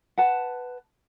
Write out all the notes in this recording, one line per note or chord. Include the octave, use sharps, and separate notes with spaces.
B4 F#5 A5